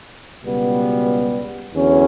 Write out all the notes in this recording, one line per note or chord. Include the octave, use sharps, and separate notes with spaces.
C#2 B2 G3 B3
E2 D3 F#3 C#4